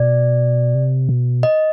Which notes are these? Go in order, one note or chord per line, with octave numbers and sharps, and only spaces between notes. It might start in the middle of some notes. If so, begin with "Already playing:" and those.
Already playing: B2 D5
C3
B2
D#5